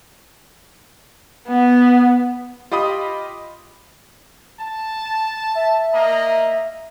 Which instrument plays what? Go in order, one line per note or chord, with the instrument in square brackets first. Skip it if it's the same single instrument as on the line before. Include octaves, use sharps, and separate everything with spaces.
[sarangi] B3
[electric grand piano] F4 G4 D#5 B5 D#6
[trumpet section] A5
[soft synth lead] E5
[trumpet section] A#3 D#5 A#5